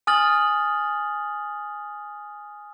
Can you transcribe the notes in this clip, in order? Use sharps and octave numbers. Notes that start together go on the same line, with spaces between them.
G#5 D#6 F6 A6 F#7